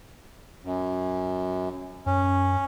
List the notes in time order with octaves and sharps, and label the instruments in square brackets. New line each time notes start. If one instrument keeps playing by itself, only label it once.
[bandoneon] F#2
[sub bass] F#2 [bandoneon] C#4